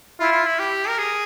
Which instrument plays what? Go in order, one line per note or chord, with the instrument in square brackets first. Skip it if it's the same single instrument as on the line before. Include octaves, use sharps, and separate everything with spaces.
[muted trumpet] E4 [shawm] F4
[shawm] F4
E4
G4
A#4
G#4